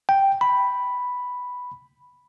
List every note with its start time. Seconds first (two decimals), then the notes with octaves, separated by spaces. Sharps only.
0.09 G5
0.41 B5